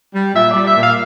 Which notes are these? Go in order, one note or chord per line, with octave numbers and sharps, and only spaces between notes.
G3
A#2 E5
G3 D5
E5
A#2
F5